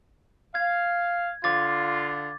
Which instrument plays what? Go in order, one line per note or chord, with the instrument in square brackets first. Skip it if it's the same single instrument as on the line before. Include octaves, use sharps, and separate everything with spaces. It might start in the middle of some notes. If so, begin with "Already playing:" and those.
[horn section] F5 [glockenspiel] G#6
[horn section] D3 F4 [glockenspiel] D6 A6